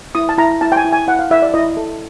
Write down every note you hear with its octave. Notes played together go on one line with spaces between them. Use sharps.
E4 D#6
A5
E4 A#5
E4 A5
G5
G#5
E4
G#5
E4 F#5
F5
E4 E5
D5
E4 D#5
A4